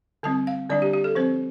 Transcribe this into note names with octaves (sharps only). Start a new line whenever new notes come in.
D3 G3 C4 A5
F5
D3 G3 D4 D5
G4
G4
A4
F3 C4 C5